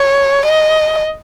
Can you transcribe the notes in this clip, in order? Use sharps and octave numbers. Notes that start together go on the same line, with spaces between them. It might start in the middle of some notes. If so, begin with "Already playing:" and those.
Already playing: C#5
D#5